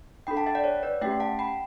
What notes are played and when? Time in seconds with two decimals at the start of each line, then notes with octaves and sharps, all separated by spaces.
0.27 D4 G5 B5
0.31 A4
0.36 F#5 A5
0.46 E5 G5
0.55 D5 F#5
0.64 C#5
0.83 B4 D5
1.01 A3 C#4 G4 E5 G5
1.20 F#5 A5
1.39 G5 B5